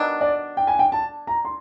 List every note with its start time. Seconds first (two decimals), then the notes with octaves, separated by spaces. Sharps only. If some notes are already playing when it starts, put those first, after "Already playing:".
Already playing: D#3 F#3 B3 D4
0.21 D5
0.57 G5
0.67 G#5
0.79 G5
0.92 A5
1.27 A#5
1.45 C6